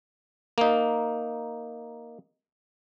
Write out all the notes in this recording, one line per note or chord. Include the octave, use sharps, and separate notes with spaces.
A#3 D#4